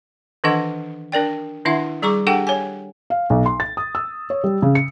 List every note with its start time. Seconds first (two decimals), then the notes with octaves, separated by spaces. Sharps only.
0.44 D#3 E3 D4 A4 D#5 F#5
1.12 D4 A#4 D5 G5
1.65 D#3 D4 E4 E5 F#5
2.02 G3 G#4 A#5 C#6 D6
2.27 D4 G4 A4 F#5 G5
2.47 C#5 G#5
3.10 F5
3.30 B1
3.46 C6
3.60 A6
3.77 D#6
3.95 E6
4.30 C#5
4.44 G3
4.62 C#3
4.75 C#7